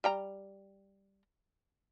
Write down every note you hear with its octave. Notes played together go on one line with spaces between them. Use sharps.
G3 G5 A#5